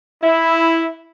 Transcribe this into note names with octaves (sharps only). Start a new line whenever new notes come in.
E4